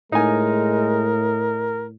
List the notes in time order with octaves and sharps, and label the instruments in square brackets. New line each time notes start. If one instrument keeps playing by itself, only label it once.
[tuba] A2 [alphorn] G#3 [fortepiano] D#4 G#5 [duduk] A#4